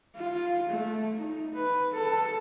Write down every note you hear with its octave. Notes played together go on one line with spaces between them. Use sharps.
F4
A3
D#4
B4
A4